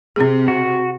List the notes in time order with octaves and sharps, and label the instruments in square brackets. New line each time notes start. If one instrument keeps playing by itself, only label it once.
[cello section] C3 [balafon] C4 G#4
[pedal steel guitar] F#4